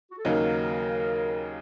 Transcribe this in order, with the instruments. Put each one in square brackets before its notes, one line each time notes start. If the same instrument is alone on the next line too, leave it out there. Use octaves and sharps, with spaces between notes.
[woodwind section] F#4
A4
[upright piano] D#2 C#3 F#3 A#3 D#4 [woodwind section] A#4